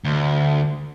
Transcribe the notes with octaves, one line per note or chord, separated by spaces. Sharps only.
D2